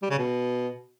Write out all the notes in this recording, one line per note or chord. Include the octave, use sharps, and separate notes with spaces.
G3
C#3
B2